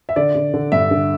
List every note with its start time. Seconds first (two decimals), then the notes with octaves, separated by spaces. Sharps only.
0.09 E5
0.16 D3 D5
0.35 D3
0.54 D3
0.72 G2 E5
0.91 D3